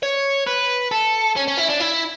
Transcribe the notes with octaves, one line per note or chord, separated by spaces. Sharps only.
C#5
B4
A4
C#4
C#4
E4
D4
E4